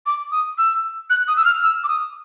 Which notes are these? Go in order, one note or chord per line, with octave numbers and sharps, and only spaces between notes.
D6
D#6
E6
F#6
D#6
E6
F6
E6
D6
D#6